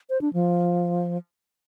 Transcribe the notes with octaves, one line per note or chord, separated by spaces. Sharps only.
C5
D4
F3